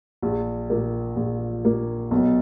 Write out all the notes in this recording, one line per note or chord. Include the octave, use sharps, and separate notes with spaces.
A#1
A#2 A#3
A#1
A#2 A#3
B1